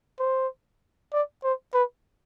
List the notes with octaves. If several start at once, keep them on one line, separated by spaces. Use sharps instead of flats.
C5
D5
C5
B4